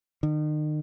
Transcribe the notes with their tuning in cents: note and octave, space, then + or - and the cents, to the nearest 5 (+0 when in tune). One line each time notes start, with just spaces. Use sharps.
D#3 -40